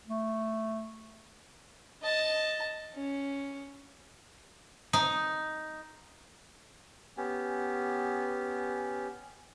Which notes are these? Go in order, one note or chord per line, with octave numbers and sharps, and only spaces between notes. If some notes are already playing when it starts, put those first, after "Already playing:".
A3
D#5 A5
C#4
D#4
B3 C#4 G4